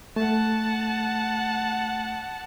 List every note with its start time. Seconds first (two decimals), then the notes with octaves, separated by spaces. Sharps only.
0.16 A3 F#5 A5